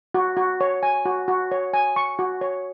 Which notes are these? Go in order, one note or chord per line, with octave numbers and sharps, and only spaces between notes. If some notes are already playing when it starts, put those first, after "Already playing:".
F#4
F#4
C#5
G#5
F#4
F#4
C#5
G#5
C#6
F#4
C#5